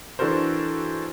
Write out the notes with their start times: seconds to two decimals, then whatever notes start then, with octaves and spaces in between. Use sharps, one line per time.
0.19 E3 D4 F#4 A4 A#4 C5